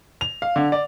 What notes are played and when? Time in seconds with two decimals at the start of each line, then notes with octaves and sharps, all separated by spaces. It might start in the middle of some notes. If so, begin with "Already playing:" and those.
0.21 F7
0.42 F5
0.56 D3
0.72 D5